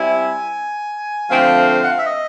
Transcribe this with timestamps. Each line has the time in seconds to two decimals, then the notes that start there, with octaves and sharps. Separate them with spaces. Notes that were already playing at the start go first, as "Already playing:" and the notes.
Already playing: G3 C4 E4 G#5
1.29 D3 F3 A3 C4 F5
1.83 F#5
1.90 F5
1.98 E5
2.06 D#5